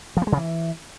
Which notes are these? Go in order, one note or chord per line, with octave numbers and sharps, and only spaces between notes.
F3
B3
G#3
C#3
E3